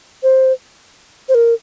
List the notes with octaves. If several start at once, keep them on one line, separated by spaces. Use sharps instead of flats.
C5
C5
A#4